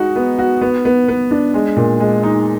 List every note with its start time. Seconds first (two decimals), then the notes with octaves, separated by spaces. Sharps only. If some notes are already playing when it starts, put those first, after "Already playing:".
Already playing: G#3 D#4 F#4
0.16 B3
0.39 F#4
0.61 B3
0.85 B3
1.08 B3
1.31 D4
1.54 G#3
1.76 A#2
2.00 G#3
2.23 D#4